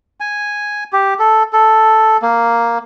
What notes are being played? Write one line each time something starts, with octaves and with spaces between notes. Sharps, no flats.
G#5
G4
A4
A4
A#3